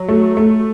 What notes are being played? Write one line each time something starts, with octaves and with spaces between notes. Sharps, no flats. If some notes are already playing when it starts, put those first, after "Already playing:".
Already playing: F#3
A3
A3